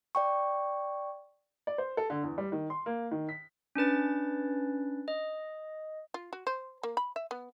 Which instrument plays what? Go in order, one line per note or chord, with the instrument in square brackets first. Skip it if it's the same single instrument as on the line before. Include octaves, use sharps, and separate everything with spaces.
[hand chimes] D5 G5 C#6
[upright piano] D5
C5
A4
D3
E2
G3
D#3
C6
A#3
D#3
B6
[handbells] C#4 D4 B4 A6
D#5
[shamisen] F4
F#4
C5
A#3
B5
E5
B3